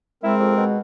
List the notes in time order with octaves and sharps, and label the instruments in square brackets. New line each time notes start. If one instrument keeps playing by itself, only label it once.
[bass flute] G#3 [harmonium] C4 A#4 [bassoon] E4
[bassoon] F2
B2